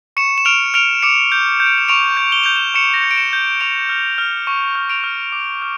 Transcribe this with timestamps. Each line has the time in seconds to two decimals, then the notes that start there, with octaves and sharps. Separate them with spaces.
0.17 C#6 C#7 E7
0.38 E7
0.45 F6 D7 F7
0.74 F6 D7 F7
1.03 D6 C#7 E7
1.32 G6
1.60 G6
1.66 D7
1.78 E7
1.88 C#6 D7 F7
2.17 G6
2.32 G7
2.44 G6 F7
2.56 E7 G7
2.74 C#6 C#7 E7
2.94 A#6
3.02 G6 C#7
3.11 D7
3.17 C#7 E7
3.33 G6
3.61 C#6 D7 F7
3.89 F6
4.18 F6
4.47 C#6
4.75 F6
4.90 D7 F7
5.04 F6
5.32 D6
5.62 F6